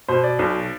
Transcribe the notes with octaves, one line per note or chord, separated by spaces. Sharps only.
B2 C5
D5
B1